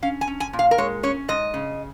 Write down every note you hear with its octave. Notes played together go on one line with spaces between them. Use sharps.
C#4 F5
G#5
C#4
G#5
A#2
F5
A#4
G#3 C#5
C#4 C#5
G#2 D#5
C#3